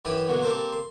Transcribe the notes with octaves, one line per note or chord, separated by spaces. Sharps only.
F#2 E3 E4 G4 B5 D#6
B2 D3 F#3 A#3
G3 A#3 C4 A4 A#4 C5
C6